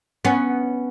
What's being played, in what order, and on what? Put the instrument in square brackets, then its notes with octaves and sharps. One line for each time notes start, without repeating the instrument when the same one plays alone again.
[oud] B3 C#4